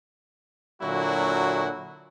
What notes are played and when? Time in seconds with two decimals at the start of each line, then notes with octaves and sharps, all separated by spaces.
0.82 A#2 D3 F#3 A#3 E4 F#4